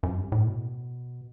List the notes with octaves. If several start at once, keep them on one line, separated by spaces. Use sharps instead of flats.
F#2
G2
A2
B2